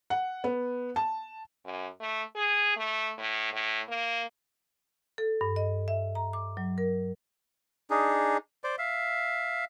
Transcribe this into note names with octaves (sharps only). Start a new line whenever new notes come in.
F#5
B3
A5
F#2
A3
G#4
A3
A2
A2
A#3
A4
G2
D#5
E5
A#5
D6
F#3
A#4
D4 D#4 G#4
C5 D5
E5 F5